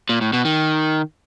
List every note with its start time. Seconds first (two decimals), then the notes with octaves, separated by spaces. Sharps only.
0.09 A#2
0.21 A2
0.33 B2
0.45 D#3